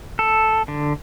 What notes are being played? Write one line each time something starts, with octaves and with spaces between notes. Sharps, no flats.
A4
D3